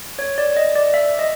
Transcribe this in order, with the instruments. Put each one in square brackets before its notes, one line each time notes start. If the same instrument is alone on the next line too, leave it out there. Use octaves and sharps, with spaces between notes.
[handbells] C#5
D5
D#5
D5
E5
D#5